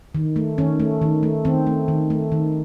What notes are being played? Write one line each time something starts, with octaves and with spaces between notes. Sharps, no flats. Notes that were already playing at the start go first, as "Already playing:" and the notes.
D#3
A3
D#3 C#4
A3
D#3
A3
D#3 C4
A3
D#3
A3
D#3